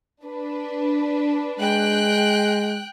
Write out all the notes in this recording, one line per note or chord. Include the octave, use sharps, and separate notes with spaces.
D4 B4
G#3 G5 F#6